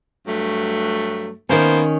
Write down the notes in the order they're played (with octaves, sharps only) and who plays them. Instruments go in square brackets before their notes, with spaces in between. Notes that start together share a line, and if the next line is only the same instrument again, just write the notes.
[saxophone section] G2 F#3 A3
[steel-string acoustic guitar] D#3 C#4 [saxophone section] A#3 B3 C5